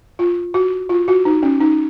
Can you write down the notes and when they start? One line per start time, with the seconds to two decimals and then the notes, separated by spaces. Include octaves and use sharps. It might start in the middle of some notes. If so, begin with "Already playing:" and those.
0.19 F4
0.54 F#4
0.89 F4
1.08 F#4
1.25 D#4
1.43 C#4
1.60 D#4